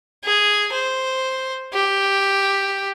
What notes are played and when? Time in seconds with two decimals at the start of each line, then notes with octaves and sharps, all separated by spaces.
0.25 G#4
0.73 C5
1.74 G4